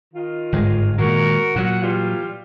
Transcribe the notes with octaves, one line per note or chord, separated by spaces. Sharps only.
D#3 F4
G1 G#2 G#3
A#2 D#3 G#3 F#4 A#4
A#2 F#3 F#5
E3 G3 F4